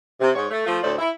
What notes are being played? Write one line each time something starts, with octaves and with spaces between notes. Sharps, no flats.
C3
G#2 C#5
A3
F3 A3 F4
D2 A2 A4 C5 D5
E4